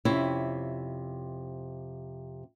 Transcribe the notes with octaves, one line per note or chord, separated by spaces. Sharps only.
F2 C3 C#4 E4